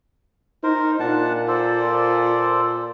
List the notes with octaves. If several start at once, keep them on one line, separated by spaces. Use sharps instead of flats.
D#4 A#4 C5
A#2 D4 F#5 A5
A4 C5 D5